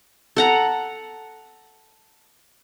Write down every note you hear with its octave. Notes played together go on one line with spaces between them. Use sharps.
A4 F#5 A#5